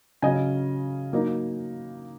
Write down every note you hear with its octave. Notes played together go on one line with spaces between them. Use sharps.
C#3 F#3 C#4 D#5 G#5
F#3 A#3 D#4